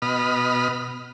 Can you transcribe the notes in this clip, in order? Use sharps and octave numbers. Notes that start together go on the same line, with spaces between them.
B2 D#5 B5 F6